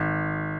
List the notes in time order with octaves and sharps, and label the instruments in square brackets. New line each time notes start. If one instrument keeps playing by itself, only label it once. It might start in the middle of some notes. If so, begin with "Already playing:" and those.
Already playing: [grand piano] G#1